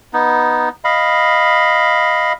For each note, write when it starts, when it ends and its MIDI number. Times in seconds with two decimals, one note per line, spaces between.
0.13 0.69 59
0.13 0.69 63
0.84 2.33 75
0.84 2.33 77
0.84 2.33 83